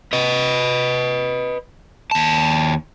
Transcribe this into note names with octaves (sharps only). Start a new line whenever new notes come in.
B4 D#5
D#2 A5